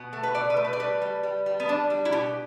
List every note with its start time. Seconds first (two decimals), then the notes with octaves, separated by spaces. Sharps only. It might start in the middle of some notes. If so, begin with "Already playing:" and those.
Already playing: B2 B3
0.13 A3
0.23 B4
0.35 B2 D5
0.50 B4
0.57 A3
0.65 B4
0.73 D5
0.80 G3 B4
1.02 G3
1.23 G3
1.46 G3
1.60 B3
1.68 G3 D4
1.90 G3
2.05 E4
2.12 B2 G4